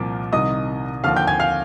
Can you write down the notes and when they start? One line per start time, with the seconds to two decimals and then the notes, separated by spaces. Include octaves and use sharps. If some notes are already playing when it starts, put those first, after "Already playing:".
Already playing: C2 A#2 F3 D6
0.33 C2 C3 D#3 D#5 D#6
1.04 D#2 D3 F3 F5 F6
1.16 G5 G6
1.27 G#5 G#6
1.40 F5 F6